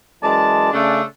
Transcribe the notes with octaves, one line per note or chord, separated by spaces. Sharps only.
F#2 E3 G#3 D5 A5
C#3 A3 D4